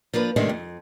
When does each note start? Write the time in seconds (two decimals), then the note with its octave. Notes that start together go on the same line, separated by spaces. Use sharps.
0.13 F3 A#3 D4 B4
0.36 C3 D#3 G#3 A3 C4 D4
0.49 F2